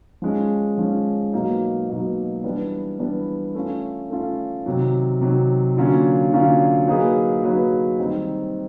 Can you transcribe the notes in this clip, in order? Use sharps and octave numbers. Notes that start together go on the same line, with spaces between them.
F3 G#3 C#4
F3 G#3 C#4
B2 F#3 A#3 D#4
B2 F#3 A#3 D#4
E3 G3 B3 D4
E3 G3 B3 D4
A3 C#4 F4
A3 C#4 F4
C3 D#3 F#3
C3 D#3 F#3
D3 F#3 A#3 C#4 F4
D3 F#3 A#3 C#4 F4
F#3 A#3 D#4 G#4 B4
F#3 A#3 D#4 G#4 B4
D#3 G3 C4 D#4